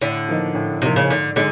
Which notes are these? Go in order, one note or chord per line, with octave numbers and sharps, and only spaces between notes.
A2 D3
F3 A#3 D#4
A2
C3 F3 A#3 D#4
C#3
G#2 D3
D3 G#3 D#4